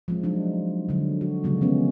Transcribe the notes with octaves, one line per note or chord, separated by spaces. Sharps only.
F3 G#3 C4
F#3 D4 D#4
D3 F#3
F#4
C#3 F3 F#3 G#3 A#3
D#3 F3 B3 C#4